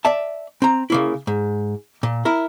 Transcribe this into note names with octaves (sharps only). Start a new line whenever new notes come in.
D5 E5 A5
C4 A#5
C#3 A#3 E4
G#2
A#2
E4 A#4